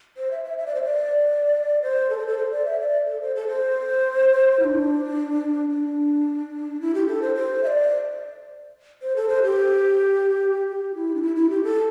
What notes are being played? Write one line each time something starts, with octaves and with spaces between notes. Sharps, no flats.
C5
E5
E5
E5
D5
C5
D5
C5
A4
C5
A4
C5
D5
E5
D5
A4
C5
A4
C5
E4
D4
D4
E4
G4
A4
C5
C5
E5
D5
C5
A4
C5
G4
G4
E4
D4
E4
E4
G4
A4